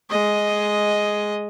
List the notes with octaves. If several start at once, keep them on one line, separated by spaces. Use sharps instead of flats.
G#3 D#5